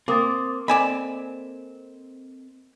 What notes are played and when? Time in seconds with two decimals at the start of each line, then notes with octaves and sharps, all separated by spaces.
0.08 A#3 C4 D6 D#6 A6
0.68 C4 A4 D5 D#5 G#5 B5 E7